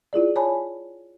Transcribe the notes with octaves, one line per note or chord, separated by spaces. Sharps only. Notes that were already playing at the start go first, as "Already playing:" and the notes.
E4 F4 G#4 D5
C#5 G#5 A5 B5